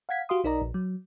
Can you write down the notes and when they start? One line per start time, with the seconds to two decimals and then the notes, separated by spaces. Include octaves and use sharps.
0.09 F5 F#5 G#6 B6
0.29 F#4 G4 F5 C6 D#6
0.44 B1 D#4 A#4 D5 D#5 A#5
0.62 A#1
0.74 F#3